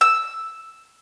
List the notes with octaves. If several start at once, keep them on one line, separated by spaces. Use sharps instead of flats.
E6